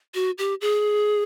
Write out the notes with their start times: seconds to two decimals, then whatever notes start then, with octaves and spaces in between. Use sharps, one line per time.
0.15 F#4
0.38 G4
0.61 G#4